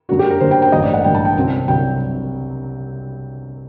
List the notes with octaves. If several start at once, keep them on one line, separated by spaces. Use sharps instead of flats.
F#2 F#3 A#3 D4 F#4
G4
A#4
F#2 F#3 A#3 D4 C5
G5
G5
A1 G2 F#3 A#3 D#5
D5
F#5
A1 G2 F#3 A#3 G5
A5
G5
C2 C3 F#3 C4
C2 C3 F#3 C4 G5